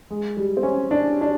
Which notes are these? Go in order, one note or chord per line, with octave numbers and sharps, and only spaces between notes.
G#3
G3
C4
C#4
D4
D4